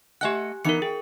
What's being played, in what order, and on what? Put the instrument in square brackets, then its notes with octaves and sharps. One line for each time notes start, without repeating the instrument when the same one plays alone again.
[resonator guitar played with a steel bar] A3 D#5 F#5 [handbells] G4 G#5 F#6
[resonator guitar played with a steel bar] E3 B3 D#4 [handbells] A#4 C#7
[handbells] G#4 [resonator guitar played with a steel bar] G5